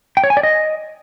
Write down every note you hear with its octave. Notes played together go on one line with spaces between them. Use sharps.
G5
C#5
G#5
D5
D#5